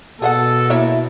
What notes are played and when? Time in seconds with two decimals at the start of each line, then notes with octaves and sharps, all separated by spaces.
0.22 B2 G#4 A4 F5 F#5
0.70 A#3 E4 C#5 E5